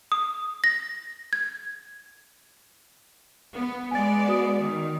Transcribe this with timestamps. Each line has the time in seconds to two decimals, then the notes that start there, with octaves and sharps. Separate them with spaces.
0.12 D#6
0.64 A#6
1.33 G#6
3.53 B3
3.91 G#3 B3 D5 G#5 A6
4.28 F#4 D#6
4.60 D#3